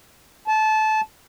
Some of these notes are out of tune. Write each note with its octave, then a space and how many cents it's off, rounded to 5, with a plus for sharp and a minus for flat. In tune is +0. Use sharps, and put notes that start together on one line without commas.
A5 -20